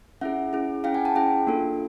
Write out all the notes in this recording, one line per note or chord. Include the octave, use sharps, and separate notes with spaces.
C#4 E4 G#4 E5 F#5
C#4 E4 G#4
C#4 E4 G#4 F5 G5
F#5 G#5
G5 A5
C#4 E4 G#4 F5 G5
A#3 D4 F4 A4